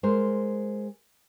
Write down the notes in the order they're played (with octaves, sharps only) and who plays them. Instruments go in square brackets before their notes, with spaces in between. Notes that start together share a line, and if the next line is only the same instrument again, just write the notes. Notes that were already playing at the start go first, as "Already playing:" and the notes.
[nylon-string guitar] G#3 A#4 C5